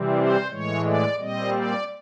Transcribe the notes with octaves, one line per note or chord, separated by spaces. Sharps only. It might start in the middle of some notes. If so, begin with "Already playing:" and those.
Already playing: C3 E3 G3 C4
C5
A2 E3 G#3 C#5
D5
A#2 G3 C4 D#5
D5